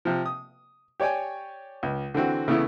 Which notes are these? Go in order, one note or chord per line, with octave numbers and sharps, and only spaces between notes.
C3 F3
D#6
G4 C#5 D5 G5 G#5
C#2
D3 E3 C4 F#4
C#3 E3 A3 B3 E4